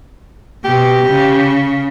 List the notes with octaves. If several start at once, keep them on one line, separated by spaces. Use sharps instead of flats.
B2 G4
C#3